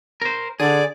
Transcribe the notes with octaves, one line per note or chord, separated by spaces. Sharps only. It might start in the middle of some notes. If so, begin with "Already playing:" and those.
A#4 C5
D3 G#4 D5